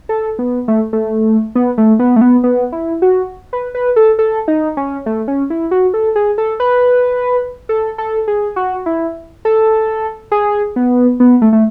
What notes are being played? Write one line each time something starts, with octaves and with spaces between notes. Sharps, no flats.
A4
B3
A3
A3
B3
A3
B3
A3
B3
B3
E4
F#4
B4
B4
A4
A4
D#4
C#4
A3
C#4
E4
F#4
A4
G#4
A4
B4
A4
A4
G#4
F#4
E4
A4
G#4
B3
B3
A3
A3